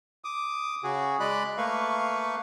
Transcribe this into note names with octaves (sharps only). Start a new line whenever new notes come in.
D6 D#6
C#3 F#4 G#4
G#3 D5 D#5 B5 F#6
A3 A#3 B4 F5 C#6